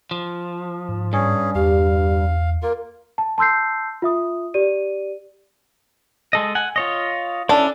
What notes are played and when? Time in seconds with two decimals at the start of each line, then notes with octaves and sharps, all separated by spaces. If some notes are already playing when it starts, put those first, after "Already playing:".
0.11 F3
0.89 G#2
1.13 G2 C#4 G#4
1.55 E2 G4 F5
2.62 A#3 F4 A#4
3.18 A5
3.38 A5 C6 E6 G6 C7
4.02 F4 E5 D#6
4.54 G4 D5 D#7
6.33 G#3 A4 D#5
6.55 F#5 G#5
6.76 F4 C#5 D#5
7.49 C#4 D4 E4 A4